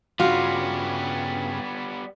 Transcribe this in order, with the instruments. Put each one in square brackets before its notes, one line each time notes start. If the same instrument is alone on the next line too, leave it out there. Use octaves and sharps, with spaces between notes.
[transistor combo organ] G2 C#3 [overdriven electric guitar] G3 B3 [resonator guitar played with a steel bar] F4 [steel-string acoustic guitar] F#4